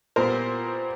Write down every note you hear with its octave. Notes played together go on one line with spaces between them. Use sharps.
A#2 G3 B3 A#4 C5